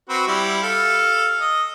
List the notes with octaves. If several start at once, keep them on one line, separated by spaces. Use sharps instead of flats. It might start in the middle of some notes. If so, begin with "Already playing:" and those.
C4 F#4 B4
G3 E4
A4 F5
D#5